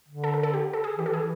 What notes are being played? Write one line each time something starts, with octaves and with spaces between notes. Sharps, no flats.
D3
A4
A#4
A4
G4
A4
G#4
E3 G4
A4
E3 G#4